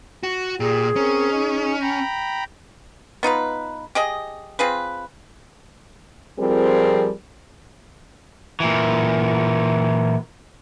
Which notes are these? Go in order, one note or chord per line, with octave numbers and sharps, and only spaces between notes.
F#4
A#2 G4 G#4
C4 C#4 A#4
D#4
G5 A#5 B5
B3 D#4 F4 B4
G4 G#4 D#5
C4 F4 G#4 B4
F2 F3 G3 C4 G#4 A#4
A#2 E3